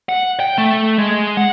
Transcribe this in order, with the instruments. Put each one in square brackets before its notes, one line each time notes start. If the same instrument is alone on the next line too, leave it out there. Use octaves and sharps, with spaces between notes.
[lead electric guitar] F#5
G5
A3
G#3
F#5